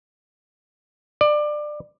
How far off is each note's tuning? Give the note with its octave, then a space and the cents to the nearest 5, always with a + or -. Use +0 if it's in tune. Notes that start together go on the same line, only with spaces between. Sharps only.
D5 +20